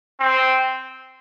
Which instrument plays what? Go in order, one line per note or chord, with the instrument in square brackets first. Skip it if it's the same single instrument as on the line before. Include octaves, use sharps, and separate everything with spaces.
[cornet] C4